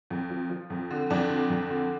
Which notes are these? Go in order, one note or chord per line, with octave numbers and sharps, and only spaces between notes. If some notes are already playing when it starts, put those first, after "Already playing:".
F2
F3
F3
F2
D3
F2 D4
D3
F2
D3